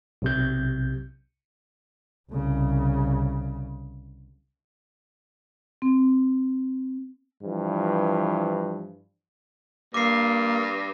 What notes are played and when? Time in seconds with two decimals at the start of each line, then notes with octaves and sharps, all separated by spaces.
0.22 B1 C3 G6
2.31 C2 C#3
5.82 C4
7.43 G2 E3 F3
9.94 G2 A#3 D6 C7